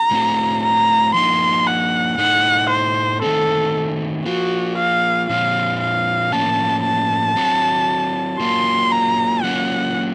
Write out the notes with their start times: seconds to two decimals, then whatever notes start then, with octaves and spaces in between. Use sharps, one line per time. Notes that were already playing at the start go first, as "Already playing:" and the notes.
Already playing: A#5
0.11 A2 A3 C4 F#4
0.63 A#5
1.14 F3 A#3 D#4 C6
1.67 F#5
2.18 A2 A3 D#4 F#5
2.70 C5
3.22 D#3 A3 C4 A4
4.25 F3 A#3 F4 F#4
4.78 F5
5.29 A#2 F3 C4 F4 F5
5.81 F5
6.32 A2 F3 A#3 C#4 A5
6.84 A5
7.36 F#3 C4 F#4
8.40 F#3 A#3 F4 C6
8.91 A#5
9.43 F#3 A#3 C#4 F4 F#5